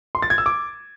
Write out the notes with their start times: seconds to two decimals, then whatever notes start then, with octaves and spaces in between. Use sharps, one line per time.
0.15 C6
0.22 A6
0.30 G#6
0.38 E6
0.46 D6